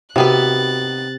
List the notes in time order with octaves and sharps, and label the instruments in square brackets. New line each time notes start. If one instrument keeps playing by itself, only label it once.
[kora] C3 [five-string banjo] D#3 B3 B4 [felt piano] F#4 [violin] F#6 A6